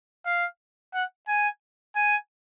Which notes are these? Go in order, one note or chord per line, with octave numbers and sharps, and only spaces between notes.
F5
F#5
G#5
G#5